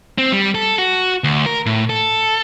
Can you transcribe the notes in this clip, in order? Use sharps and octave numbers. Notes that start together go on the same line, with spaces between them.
C4
G3
A4
F#4
D2
A#4
A2
A4